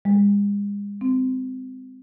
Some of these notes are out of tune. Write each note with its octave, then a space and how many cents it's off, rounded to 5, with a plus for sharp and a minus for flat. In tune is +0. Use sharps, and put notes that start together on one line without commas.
G#3 -40
C4 -25